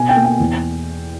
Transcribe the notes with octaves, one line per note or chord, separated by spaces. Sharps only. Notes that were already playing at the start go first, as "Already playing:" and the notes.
Already playing: B2 G#5
G5
A#3
G5
E2